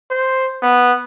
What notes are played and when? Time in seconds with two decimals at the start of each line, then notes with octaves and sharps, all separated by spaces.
0.11 C5
0.62 B3